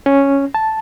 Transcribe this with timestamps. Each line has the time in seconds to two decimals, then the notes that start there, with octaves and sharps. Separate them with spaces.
0.06 C#4
0.54 A5